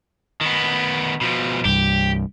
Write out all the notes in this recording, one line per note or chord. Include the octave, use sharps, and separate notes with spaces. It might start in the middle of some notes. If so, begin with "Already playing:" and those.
D#3 B3
B2 F3
C2 G2 G4